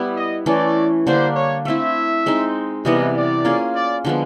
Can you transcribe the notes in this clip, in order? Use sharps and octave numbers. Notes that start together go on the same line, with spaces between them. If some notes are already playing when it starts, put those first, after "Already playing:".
Already playing: G3 B3 E4
D#5
E3 A3 C#4 D5
D3 G3 A#3 D4 C5
C#5
A3 C4 E4 E5
G#3 C4 D#4
C3 E3 G3 B3 D#5
D5
A#3 C#4 F4 G#4
D5
D3 F3 G#3 B3